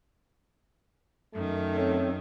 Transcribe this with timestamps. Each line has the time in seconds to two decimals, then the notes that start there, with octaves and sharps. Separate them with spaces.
1.34 F#2 D#3 A3
1.76 C4 A4 C#5